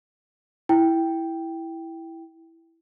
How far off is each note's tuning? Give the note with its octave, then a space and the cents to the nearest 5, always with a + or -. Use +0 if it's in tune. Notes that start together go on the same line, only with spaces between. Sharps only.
E4 +0 G5 +0